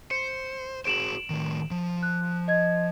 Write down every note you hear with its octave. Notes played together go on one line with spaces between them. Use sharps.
C5 C#7
F#4 G#4 C5 D7 E7 F#7
A2 D#3
F3
F#6
D#5 G#6